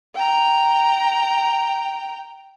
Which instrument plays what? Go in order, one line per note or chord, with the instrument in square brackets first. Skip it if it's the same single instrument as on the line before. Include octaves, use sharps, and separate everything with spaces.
[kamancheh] G5 A#5